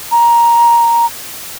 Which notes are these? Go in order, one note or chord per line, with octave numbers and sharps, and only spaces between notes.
A#5